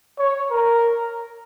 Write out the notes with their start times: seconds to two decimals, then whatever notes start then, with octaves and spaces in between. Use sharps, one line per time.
0.19 C#5
0.51 A#4